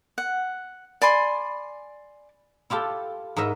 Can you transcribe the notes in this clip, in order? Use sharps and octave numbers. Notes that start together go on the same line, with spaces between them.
F#5
D5 G#5 B5 C6
E4 F4 G4 A4
G#2 A#4 D#5 E5 B5